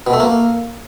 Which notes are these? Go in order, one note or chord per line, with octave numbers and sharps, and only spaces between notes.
B2
A3
A#3